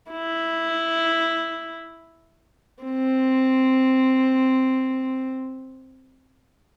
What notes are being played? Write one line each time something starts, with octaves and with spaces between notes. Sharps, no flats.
E4
C4